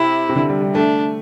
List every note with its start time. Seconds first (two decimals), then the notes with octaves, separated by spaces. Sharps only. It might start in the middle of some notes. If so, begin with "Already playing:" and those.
Already playing: C3 E4
0.29 C3
0.36 D3
0.49 G3
0.61 G3
0.74 A3 D4